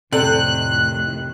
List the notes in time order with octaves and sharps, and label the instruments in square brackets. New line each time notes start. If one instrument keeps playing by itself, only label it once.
[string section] F2 A2 D#3 [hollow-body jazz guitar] C3 [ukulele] A4 D5 [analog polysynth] F#6